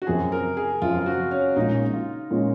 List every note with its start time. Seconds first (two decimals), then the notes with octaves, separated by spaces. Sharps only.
0.02 F#4
0.07 F#2 F3 C4 G#4
0.32 A#4
0.57 G#4
0.82 F#2 F3 C4 F4
0.99 F4
1.06 F#4
1.31 C#4
1.56 A#1 A#2 G#3 C#4 D#4
1.93 F4
2.31 A#2 G#3 C#4